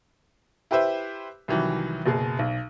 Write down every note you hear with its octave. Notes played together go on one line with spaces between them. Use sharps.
E4 G4 B4 C5 E5
C2 D#3 E3 F#3
F#1 B2 G#4
B1